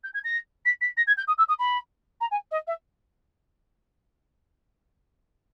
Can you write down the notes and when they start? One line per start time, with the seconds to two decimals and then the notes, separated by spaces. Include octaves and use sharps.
0.04 G6
0.14 G#6
0.24 A#6
0.65 B6
0.81 B6
0.97 A#6
1.07 G#6
1.17 G6
1.27 D#6
1.38 E6
1.48 D#6
1.59 B5
2.21 A#5
2.31 G#5
2.51 D#5
2.67 E5